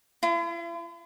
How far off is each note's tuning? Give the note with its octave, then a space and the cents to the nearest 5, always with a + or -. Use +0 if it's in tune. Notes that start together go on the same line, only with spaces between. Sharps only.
E4 +45